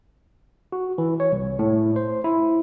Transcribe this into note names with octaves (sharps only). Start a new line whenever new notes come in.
F#4
E3
C#5
C2
A2
C5
E4